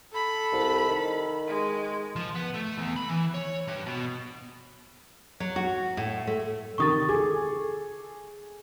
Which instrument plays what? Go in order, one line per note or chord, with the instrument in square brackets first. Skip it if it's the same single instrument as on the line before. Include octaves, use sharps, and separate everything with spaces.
[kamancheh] A4 B5
[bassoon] C2
D#3
[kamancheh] G#3
[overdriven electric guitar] F3
B3
A3
E2
B5
E3
C#5
G2
B2
[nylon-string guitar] F#3
F#4
A2
A3
[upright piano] C3 D#3 A#4 [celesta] C#6 D#6 A6
[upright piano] G#4 A4 [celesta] D6